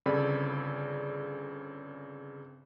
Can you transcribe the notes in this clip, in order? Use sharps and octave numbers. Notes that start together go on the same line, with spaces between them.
G1 C#3 C4 A4 D5 B5